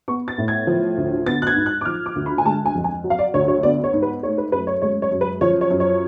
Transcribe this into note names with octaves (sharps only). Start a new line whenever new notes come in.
B3 C#6
A6
A2
G#6
F3
D2
B3 A6
F#6
G#6
G#2
F#6
D6
F3 F6
D6
D2
B5
G#5
G#3 A5
G#5
F2
G#5
F#3
F5
D5
D2 C#5
C#5
B3 D5
C#5
G#2
B4
A3 C#5
B4
F#2 B4
C#5
G#3 C#5
C#5
F#2
B4
F3 C#5
C#5
F#2
C#5